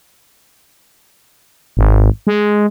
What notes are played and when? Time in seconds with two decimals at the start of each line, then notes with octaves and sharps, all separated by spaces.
1.77 G#1
2.27 G#3